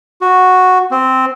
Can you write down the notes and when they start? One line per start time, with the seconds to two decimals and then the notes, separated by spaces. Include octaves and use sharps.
0.21 F#4
0.91 C4